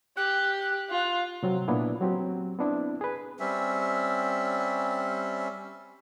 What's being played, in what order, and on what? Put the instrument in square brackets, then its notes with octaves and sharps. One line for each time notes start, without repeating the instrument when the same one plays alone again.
[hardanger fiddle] G4 [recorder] F#6
[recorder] F#6
[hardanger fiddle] F4
[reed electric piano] C3 F#3 C4
A#2 A#3 B3 D4 E4
F#3 C4 G4
B3 C4 D4 E4
G#4 B4
[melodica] G3 C4 C#4 E5